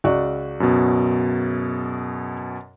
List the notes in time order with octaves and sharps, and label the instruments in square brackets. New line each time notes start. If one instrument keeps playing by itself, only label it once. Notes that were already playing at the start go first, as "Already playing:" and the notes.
[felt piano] C#2 F#4 D5
[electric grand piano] F#2 B2